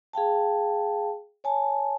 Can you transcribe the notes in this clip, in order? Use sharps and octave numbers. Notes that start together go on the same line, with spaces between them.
G#4 F5 G5 A5
C#5 G#5 A5